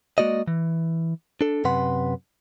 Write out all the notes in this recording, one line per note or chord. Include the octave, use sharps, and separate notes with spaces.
G#3 A#3 F#4 D5 D#5
E3
D4 A4
F#2 C3 B4 F#5 C6